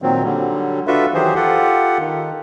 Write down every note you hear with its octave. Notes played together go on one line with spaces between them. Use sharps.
A#2 D#3 F#3 C4
D3 F#3 G3
D4 F4 F#4 A4 B4 E5
D#3 E3 F#3 G4 G#4 C5
F4 G4 A4 F#5
D#3